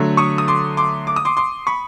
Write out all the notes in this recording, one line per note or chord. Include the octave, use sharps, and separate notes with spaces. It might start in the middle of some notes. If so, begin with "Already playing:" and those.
Already playing: D3 F#3 A3
C#6 D#6
D#6
C6 D6
C6 D6
D6
D#6
C6 D6
C6 D6
B5 C#6